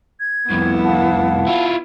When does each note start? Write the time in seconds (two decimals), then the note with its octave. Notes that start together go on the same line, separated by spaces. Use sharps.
0.20 G#6
0.50 C2 F2 B3 E4
0.84 F5 F#5 A5
1.47 E4 F4